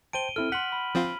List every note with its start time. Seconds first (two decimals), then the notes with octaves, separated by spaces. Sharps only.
0.13 C5 G5 A5 D7 D#7 G7
0.36 C4 E4 A4 F6
0.52 F#5 C6 B6 F#7
0.72 B5
0.95 F3 C4 F4